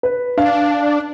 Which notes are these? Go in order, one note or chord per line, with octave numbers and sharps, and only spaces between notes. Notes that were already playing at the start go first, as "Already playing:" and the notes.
B4
D4 F5